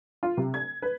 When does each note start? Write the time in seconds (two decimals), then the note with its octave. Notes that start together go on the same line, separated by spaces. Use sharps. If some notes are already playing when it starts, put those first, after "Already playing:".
0.23 F4
0.37 C3
0.54 G#6
0.82 B4